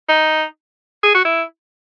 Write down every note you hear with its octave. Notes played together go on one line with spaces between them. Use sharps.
D#4
G#4
F#4
E4